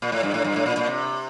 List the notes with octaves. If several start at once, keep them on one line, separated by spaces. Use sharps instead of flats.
A#2
A2
G2
A2
G2
A2
A#2
A#2
C3